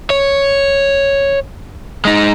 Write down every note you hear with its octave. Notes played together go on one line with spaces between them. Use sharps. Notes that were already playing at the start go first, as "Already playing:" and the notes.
C#5
G#3 D#4